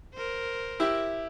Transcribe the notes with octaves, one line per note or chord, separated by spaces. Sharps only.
A#4 C5
E4 G4 E5